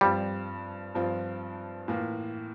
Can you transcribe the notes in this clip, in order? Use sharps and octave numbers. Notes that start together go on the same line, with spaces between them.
G2 F3 G3 C4 F4
G2 F3 C4 F4
A2 E3 A#3 F4